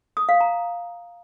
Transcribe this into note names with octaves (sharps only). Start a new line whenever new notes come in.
D#6
F5
A#5